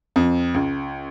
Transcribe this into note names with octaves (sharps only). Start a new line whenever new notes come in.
F2
C#2